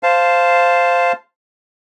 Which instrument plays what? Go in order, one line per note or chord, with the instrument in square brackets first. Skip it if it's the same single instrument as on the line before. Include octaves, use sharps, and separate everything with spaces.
[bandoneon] C5 F5 A5